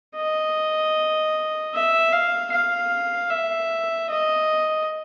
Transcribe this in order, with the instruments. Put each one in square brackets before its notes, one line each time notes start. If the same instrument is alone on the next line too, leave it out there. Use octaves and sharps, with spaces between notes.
[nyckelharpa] D#5
E5
F5
F5
E5
D#5